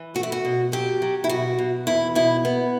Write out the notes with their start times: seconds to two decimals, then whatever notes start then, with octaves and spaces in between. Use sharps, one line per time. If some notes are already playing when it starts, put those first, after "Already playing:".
Already playing: E3
0.15 A3 F#4
0.23 E4
0.32 F#4
0.45 B2
0.72 F#3 G4
1.02 F#3
1.24 E4
1.29 B2 F#4
1.58 B2
1.87 E2 E4
2.15 B2 E4
2.45 B3